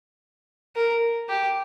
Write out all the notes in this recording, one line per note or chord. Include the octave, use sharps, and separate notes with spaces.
A#4
G4